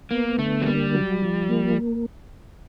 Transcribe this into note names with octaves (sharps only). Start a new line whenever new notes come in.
A#3 B3
D3 A3
F#3
G3 A#3
F#3
F3
A#3